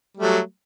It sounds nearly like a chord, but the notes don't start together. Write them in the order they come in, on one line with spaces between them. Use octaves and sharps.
G3 A3 F#3